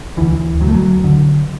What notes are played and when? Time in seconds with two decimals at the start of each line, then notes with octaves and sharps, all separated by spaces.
0.17 D2 D3 E3
0.60 D2 F#3
0.68 A3
0.74 F#3
1.04 D3